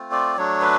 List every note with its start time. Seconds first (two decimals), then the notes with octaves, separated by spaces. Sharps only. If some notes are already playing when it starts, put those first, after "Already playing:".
Already playing: A3 C4 F4
0.11 D5
0.37 F#3 A3 D4 C#5
0.61 B4